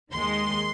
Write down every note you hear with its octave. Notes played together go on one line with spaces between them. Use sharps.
D#2 D#3 G#3 C6